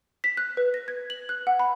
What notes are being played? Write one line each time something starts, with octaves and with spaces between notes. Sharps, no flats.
B6
F#6
B4
A#6
G#6
F#7
F#6
F#5
B5